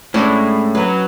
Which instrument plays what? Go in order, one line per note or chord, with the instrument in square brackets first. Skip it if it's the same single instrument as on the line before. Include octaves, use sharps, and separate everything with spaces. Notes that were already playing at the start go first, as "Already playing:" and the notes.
[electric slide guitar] A2 [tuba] G#3 [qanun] C#4 D4 E4
[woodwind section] F#3 [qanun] B4